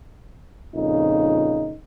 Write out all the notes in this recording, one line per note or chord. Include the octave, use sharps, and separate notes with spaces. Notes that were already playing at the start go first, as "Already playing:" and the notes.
F2 A#2 C#3 D#4